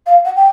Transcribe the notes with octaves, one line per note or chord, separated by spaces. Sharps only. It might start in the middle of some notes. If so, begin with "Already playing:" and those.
F5
F#5
G5